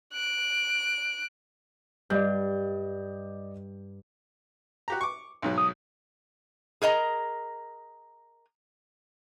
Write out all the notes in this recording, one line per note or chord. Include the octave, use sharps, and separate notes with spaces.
F#6 D7
G2 D5 D#5 G6
F#4 G4 A#5
C#6 D6
B1 G#2 F#3
D#6
G#4 A#4 D#5 A#5